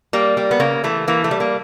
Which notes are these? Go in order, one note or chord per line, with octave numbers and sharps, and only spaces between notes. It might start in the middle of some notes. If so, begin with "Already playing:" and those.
G3 A#3
G3
B3
C#3 A#3
E3 A3
E3 A#3
A3
G3
A#3